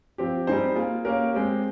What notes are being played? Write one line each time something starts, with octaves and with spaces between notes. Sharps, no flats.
F3 C4 G4
G3 C4 D#4 G#4 C5
A#3 F4 G#4
A#3 C#4 G4 A#4
G#3 C4 G4